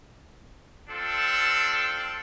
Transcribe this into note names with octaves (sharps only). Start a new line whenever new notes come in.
C4 D4 F4 A4